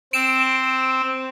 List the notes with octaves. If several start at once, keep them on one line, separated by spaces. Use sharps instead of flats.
C4 D7 E7